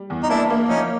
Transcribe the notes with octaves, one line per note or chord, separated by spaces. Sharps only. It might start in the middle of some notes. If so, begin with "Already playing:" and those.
Already playing: G3
E2
D#4
A#3 D4 E4
A#3
F3 C#4 D#4